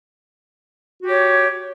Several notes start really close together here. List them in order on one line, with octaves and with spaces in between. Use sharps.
F#4 G4 C#5